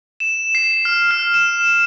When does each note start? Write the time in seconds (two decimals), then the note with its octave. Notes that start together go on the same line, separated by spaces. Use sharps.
0.20 E7
0.55 C7
0.85 F6
1.11 F6
1.34 E7